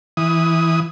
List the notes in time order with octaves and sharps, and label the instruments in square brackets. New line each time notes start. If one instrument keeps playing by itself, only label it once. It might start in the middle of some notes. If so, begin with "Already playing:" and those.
[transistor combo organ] E3 D#6